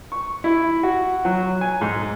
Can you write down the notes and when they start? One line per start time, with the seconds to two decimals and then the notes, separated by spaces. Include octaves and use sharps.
0.12 C#6
0.44 E4
0.83 F#4
1.25 F#3
1.61 G#5
1.81 G#2